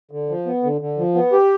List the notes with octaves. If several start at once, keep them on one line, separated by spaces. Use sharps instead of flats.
D3
F3
B3
D3
D3
F3
B3
G4